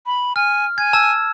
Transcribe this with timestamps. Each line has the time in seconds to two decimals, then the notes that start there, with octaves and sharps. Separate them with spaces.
0.06 B5
0.36 G#5 F6
0.78 G#5 G#6
0.93 A5 E6